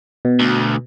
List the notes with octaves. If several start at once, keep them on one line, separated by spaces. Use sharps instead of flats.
B2
D2